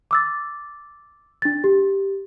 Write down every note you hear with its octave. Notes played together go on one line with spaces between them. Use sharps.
D6 E6 A6
D4 A6
G4